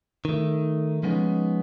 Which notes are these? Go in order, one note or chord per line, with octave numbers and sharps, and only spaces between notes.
D#3 A3
F3 G#3 B3 C#4 D#4